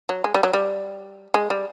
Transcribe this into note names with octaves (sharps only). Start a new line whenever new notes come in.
F#3
G#3
G3
F#3
G3
G#3
G3